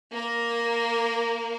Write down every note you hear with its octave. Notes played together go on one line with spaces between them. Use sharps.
A#3 A#4